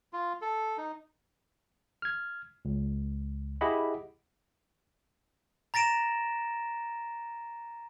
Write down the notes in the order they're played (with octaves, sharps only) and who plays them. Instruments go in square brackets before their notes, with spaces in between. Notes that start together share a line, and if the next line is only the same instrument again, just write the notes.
[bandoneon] F4
A4
D#4
[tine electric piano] F6 G#6
C#2
E4 G4 G#4 D#5 F#5 B5
[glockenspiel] A#5 A6 A#6 D7 E7